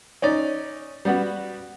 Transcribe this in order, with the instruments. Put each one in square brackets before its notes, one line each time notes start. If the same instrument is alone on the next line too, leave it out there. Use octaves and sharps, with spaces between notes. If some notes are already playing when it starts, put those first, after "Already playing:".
[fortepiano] C#4 D#4 D5
G3 B3 F#4